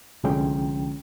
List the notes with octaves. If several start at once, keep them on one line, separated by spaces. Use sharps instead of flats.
C2 D3 F3 G#3 C#4 G5